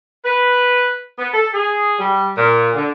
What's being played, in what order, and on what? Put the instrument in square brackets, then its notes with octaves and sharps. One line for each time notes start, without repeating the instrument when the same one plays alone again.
[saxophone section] B4
B3
A4
G#4
G3
A#2
D3